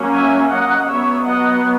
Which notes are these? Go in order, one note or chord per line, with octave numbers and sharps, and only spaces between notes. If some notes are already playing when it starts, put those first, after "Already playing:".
Already playing: F#3 A#3 C#4
E5 G#5
D#5 F#5
F#3 B3 C#5 E5
D#5 F#5